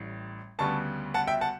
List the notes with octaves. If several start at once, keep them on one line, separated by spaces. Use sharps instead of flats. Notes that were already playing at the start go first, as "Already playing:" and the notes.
Already playing: A1 A2 G3
D2 C#3 G3 B3 A5 C#6
F#5 A5
E5 G5
F#5 A5